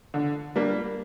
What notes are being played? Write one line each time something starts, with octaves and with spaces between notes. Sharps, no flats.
D3
G3 A#3 D4